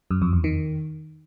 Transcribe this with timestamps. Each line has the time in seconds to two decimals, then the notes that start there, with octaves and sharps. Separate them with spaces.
0.11 F#2
0.22 F2
0.33 E2
0.44 D#3